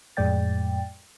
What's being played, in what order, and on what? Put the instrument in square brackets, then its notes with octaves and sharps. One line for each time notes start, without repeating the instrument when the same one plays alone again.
[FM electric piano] F2 A2 G#3 D5 G5 A6